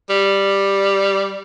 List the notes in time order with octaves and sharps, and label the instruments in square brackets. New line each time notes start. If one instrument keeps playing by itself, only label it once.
[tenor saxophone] G3